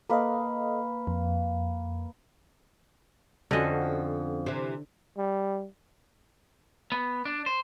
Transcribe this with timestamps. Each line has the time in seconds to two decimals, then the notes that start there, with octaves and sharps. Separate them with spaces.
0.10 A#3 A4 B4 D#5 F5
1.07 F2
3.51 F2 D3 C#4 F#4 D#5
4.46 C3 E3
5.17 G3
6.92 B3
7.25 D4
7.46 C5